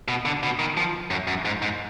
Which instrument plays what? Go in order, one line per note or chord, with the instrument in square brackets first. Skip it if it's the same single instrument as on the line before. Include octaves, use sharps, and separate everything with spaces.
[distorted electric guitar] B2
D3
B2
D#3
F3
F#2
F#2
G#2
G#2